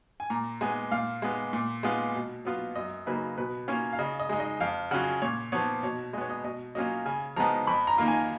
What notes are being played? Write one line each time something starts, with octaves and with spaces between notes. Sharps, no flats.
G#5
A#2 A#5
G#3 B3 G#5
A#2 F5
G#3 B3
A#2
G#3 B3 F4
B2
F#3 B3 F4
F#2 D#5
C#3 F#3 A#3 D#4 B4
B2 B4
A#3 C#4 F4 C#5
F5
C#3 D#5
D#5
G#3 D#4
D#5
F2 F5
C#3 F#3 C#4 F4 F#5
A#2 C#5
F3 B3 C#5
B2 C#5
G#3 B3 C#5 D#5
D#5
B2 D#5
F#3 A#3 C#4 F4 D#5
C#3 G#5
F3 G#3 B3 D#4 A#5
F2 B5
A#5
D#3 A#3 F4
G#5